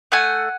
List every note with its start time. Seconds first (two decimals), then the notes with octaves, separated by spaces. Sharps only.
0.12 A3 F#5 G#5